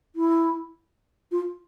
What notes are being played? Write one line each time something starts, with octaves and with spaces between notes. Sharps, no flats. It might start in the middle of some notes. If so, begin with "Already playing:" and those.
E4
F4